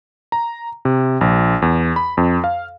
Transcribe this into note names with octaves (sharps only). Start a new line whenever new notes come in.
A#5
C3
A#1
E2
B5
F2
F5